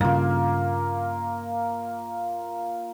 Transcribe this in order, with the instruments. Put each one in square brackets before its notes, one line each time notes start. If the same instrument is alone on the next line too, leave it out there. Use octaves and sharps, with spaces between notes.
[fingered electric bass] G2 C#3 [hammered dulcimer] A#3 F4